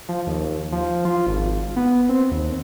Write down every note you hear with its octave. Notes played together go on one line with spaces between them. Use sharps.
F3
D#2
F3
F4
G#1
B3
C4
D#2